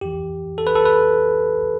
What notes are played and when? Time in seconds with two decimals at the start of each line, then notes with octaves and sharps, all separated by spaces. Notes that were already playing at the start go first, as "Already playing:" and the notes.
0.01 F2 E3 G4
0.58 A4
0.67 B4
0.76 A4
0.85 B4